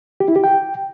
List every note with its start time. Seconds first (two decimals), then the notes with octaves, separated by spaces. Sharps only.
0.20 G4
0.28 E4
0.36 G4
0.44 G5